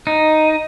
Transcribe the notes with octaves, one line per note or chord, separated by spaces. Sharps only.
D#4